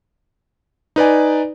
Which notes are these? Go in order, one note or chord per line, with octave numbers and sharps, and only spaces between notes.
D#4 B4 D5 G#5